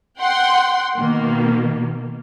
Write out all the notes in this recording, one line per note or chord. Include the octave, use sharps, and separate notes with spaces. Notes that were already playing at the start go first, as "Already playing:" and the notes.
F#5 G5 C6
B2 D#3 A#3